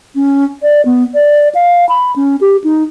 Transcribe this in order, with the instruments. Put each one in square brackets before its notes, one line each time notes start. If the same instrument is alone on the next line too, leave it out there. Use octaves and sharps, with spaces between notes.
[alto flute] C#4
D5
B3
D5
F5
B5
C#4
G4
D#4